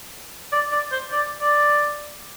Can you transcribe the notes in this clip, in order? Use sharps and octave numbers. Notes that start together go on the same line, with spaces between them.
D5
D5
C5
D5
D5